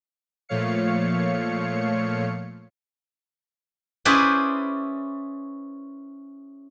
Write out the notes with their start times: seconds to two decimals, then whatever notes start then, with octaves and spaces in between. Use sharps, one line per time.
0.49 A#2 F3 A3 C#5 F5 C#7
4.05 C#4 E4 G#4 B4 C5 D5